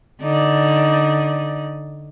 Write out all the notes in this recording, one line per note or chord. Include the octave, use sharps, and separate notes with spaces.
D3 D#4 D5